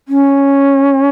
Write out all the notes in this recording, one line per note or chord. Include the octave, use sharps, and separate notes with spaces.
C#4